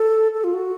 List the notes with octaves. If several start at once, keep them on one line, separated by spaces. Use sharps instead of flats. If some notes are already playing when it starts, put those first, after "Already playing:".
Already playing: A4
A4
F4
F#4